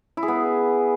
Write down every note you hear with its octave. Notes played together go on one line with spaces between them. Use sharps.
E4
G#4
B3